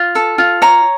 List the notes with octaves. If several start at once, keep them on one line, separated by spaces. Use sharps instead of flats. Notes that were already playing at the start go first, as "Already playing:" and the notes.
Already playing: F4
A4
F4
C#5 A#5